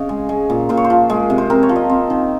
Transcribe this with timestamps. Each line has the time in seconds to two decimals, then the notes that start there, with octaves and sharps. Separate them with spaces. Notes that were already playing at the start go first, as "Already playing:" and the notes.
Already playing: C#3 C#5 D#5
0.09 G#3
0.29 G#3
0.50 A#2
0.69 A#2 C5
0.77 C#5
0.84 C5
0.90 F3
1.10 G#3
1.30 C3
1.38 C5
1.50 C4 A#4
1.63 C#5
1.69 F3
1.76 D#5
1.90 C4
2.10 D#3